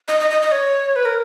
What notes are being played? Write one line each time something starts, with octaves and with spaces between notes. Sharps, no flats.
D#5
D#5
D#5
D#5
C#5
B4
A#4